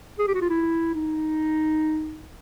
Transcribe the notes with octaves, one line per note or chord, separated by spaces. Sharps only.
G#4
G4
F#4
F4
E4
D#4